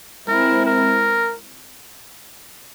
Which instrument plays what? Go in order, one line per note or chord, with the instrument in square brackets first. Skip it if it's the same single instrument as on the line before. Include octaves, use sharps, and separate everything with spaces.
[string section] G#3 C4 E4 [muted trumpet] A#4
[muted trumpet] A#4